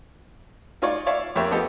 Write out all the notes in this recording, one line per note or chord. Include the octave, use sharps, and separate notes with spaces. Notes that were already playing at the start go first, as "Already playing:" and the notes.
D#4 F4 C#5 D5
C#5 D5 E5 F5
F2 A#3 G4 C#5 E5 G5
F3 B3 G4 A4 D#5